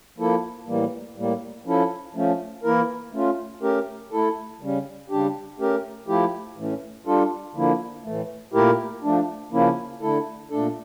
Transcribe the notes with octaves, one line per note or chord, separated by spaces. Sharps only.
F3 A#3 E4 A4
A2 E3 G3 A#3
A2 G3 A#3
F3 C#4 E4 A4
F3 A3 C#4
E3 A#3 E4 A#4
A3 C#4 F4
A3 C#4 G4 A#4
A3 E4 A4
C#3 G3 C#4
C#3 G3 D4 G4
A3 C#4 G4 A#4
F3 A3 E4 G4
A2 E3 A3 C#4
G3 D4 F4 A4
D3 F3 A#3 E4
A2 E3 A3
A#2 A3 E4 G4 A#4
F3 A3 D4
C#3 F3 A#3 C#4 E4
D3 A3 E4 A4
A#2 A3 D4 A4